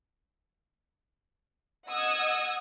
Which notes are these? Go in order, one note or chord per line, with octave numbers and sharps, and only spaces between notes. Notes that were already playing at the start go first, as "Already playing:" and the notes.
D#5 F#5 D#6 E6 G#6